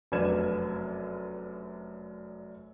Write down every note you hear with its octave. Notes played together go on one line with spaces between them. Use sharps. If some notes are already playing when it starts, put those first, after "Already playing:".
F1 F#2 D4 B4 G#6 E7